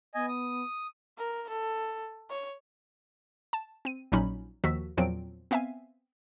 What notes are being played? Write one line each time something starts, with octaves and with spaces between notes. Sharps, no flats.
B3 D#5 G#5
D#6
A#4
A4
C#5
A5
C4 D#7
A#1 A#2 F#3 C#4 D#4 B5
D#2 D#3 F3 F#4 E6 B6
E2 A#2 F3 F#3 C4 D7
B3 C4 E5 F5 G#5